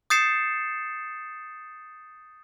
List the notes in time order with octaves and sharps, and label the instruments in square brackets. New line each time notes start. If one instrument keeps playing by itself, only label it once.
[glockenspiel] D#6 G6 A6 C7 C#7 E7